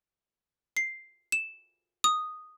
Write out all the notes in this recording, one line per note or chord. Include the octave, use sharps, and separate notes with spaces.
C7
E7
D#6